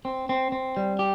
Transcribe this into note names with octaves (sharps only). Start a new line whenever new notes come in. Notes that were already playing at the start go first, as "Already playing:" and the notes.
C4
C4
C4
G3
G4